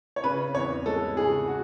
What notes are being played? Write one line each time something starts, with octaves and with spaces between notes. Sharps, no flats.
C#5
C#3 B4
E2 C#5
G#3 A4
C#3 G#4
F#4